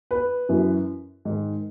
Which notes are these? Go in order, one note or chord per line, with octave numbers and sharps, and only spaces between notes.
B4
F#2 E3
G#2 D#3